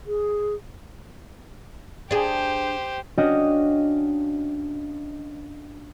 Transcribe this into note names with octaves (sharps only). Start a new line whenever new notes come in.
G#4
D4 G4 G#4 C5
C#4 D4 F#4 D#5 F5 G5